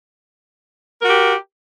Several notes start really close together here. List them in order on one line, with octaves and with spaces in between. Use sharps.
A#4 F#4 G4